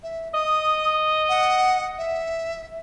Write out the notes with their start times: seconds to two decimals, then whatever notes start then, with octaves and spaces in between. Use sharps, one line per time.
0.03 E5
0.34 D#5 D#6
1.29 F#5
1.98 E5